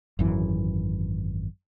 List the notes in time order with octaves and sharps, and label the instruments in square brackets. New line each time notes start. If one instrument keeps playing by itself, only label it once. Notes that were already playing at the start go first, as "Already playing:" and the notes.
[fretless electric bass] G#1 F#2 E3